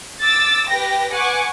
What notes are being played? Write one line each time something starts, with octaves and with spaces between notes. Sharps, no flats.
D6 E6 A6
G4 B4 G5 A#6
B4 F#5 G#5 C#6 D6